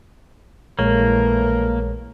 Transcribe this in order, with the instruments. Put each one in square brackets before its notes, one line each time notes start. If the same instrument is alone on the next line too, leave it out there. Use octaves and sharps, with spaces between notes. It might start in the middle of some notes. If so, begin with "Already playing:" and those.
[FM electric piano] A#1 G#3 C#5 [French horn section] A2 E3 A#4 [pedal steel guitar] A#3